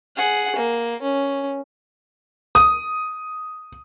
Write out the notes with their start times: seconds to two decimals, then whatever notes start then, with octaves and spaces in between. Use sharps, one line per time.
0.17 G#4 F#5
0.56 A#3
1.02 C#4
2.55 D#6